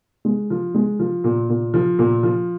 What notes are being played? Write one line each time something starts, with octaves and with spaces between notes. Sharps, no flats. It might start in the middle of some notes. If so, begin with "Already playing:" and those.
G#3
F3
G#3
F3
A#2
A#2
F3
A#2
F3